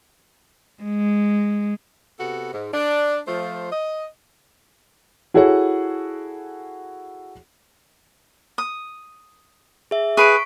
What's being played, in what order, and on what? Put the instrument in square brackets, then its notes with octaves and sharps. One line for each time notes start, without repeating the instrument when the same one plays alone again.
[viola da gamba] G#3
[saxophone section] C3 B3 F#4 A4
G#2
D4
F3 A3 F4 C5
D#5
[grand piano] E4 F#4 G#4 A4 C#5 F#5
[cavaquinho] D#6
[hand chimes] G#4 E5
[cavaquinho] G#4 B4 [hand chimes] C#6 B6 D7